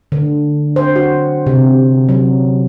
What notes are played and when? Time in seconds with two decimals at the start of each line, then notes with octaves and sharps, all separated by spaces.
0.12 D3
0.76 C5
0.96 F#4
1.46 C3
2.09 F#3